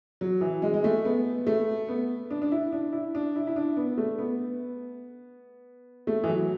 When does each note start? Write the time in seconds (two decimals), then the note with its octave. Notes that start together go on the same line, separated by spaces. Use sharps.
0.21 F#3
0.41 E3
0.62 G#3
0.73 G#3
0.84 A3
1.05 B3
1.47 A3
1.89 B3
2.31 D4
2.42 D4
2.52 E4
2.73 D4
2.93 E4
3.15 D4
3.36 E4
3.47 E4
3.56 D4
3.77 B3
3.98 A3
4.19 B3
6.07 A3
6.24 E3
6.29 F#3